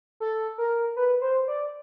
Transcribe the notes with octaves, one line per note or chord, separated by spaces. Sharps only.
A4
A#4
B4
C5
D5